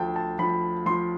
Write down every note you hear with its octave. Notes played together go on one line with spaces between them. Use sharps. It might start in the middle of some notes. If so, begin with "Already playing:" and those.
Already playing: D2 F3 G5 A5
A5
F3 B5
F3 C6